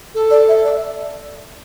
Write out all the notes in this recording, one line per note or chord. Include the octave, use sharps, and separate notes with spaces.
A4
D5
E5
D5